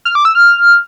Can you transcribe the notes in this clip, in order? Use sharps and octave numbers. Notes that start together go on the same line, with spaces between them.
F6
D6
E6
F6